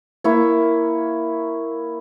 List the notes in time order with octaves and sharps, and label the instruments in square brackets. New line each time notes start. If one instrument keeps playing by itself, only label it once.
[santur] A#3 E4 C#5